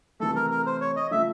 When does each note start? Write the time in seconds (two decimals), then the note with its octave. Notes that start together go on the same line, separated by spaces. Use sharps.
0.20 C3 E3 A3 A4
0.36 A#4
0.51 A#4
0.66 C5
0.81 C#5
0.96 D#5
1.11 C#3 F3 A3 E5